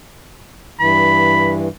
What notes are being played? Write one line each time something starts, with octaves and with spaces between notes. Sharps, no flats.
G2 E3 B5